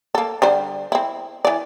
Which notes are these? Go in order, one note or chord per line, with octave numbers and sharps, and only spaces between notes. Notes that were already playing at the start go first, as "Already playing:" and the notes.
A#3 A4
D3 G3 C5
C4 E4
E3 D5